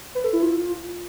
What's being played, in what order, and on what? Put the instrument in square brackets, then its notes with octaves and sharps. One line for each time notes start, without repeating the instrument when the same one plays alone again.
[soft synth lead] B4
A4
E4
F4